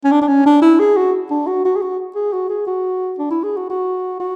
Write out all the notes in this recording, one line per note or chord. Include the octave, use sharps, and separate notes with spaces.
C#4
D4
D4
C#4
D4
E4
G#4
F#4
D4
F#4
F#4
G#4
F#4
G#4
F#4
G#4
F#4
D4
E4
G#4
F#4
F#4
F#4